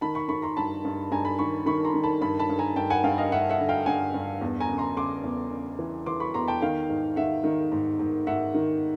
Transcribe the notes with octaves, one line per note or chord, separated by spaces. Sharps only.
D#3 A5 B5
B5 C#6
D#3 B5 C#6
A#5 C6
G2 A5 B5
G2
G2 G#5 A#5
A5 B5
D#3 B5 C#6
D#3 B5 C#6
A#5 C6
D#3
A5 B5
G2 A5 B5
A5 B5
G2
G#5 A#5
G2 G5 A5
F#5 G#5
G2 F5 G5
D#5 F5
G2 E5 F#5
E5 F#5
D3
F5 G5
G2 F#5 G#5
G2
E2
G#5 A#5
C#3
A#5 C6
C#3 C6 D6
E2
C#3
E3
E3 C6 D6
B5 C#6
E2 A#5 C6
G5 A5
D#3 F5 G5
G#2
D#3 E5 F#5
D#3
G#2
G#2
G#2 E5 F#5
D#3